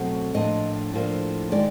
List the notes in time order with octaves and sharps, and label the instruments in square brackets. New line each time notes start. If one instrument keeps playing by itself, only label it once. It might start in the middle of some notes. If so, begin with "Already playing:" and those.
Already playing: [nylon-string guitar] B2 F#3 A3 C4
A2 F3 A#3 D4 D#5
A2 F3 A#3 D4
D#3 G#3 D5